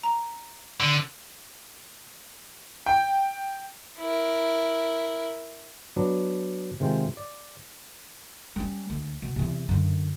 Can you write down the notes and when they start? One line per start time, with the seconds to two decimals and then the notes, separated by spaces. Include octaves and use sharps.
0.03 A#5
0.80 D3
2.86 G5
3.99 E4 A#4
5.96 F#3 B3 D4
6.80 C3 D#3 G#3 F4 G5
7.17 D5
8.56 G3 C#4
8.90 D2
9.22 B2
9.36 E2 C3
9.69 F#2 D3